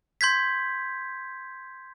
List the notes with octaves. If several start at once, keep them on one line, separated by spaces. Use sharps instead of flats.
C6 G6 G#6 B6